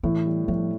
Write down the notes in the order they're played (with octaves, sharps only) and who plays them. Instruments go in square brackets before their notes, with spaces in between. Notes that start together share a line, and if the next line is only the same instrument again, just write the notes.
[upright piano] A2 [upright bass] E3
[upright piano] G3
[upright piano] A2 [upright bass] F3